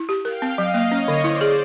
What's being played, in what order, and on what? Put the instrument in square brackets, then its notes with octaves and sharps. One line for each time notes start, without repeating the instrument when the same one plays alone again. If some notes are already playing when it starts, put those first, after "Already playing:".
Already playing: [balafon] E4
G4
[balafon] A#4 [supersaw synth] F5 G5
[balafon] C4
[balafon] F#3 [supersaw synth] D#5 F5
[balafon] A#3
[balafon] C#4 [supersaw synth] C#5 D#5
[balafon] D3
[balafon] E4 [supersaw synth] C5 D5
[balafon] G#4